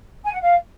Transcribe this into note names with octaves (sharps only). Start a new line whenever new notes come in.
G#5
F#5
F5